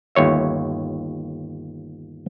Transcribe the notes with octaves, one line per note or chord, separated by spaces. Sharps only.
G1 D#2 C#5 E5